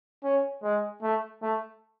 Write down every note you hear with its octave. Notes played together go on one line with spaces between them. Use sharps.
C#4
G#3
A3
A3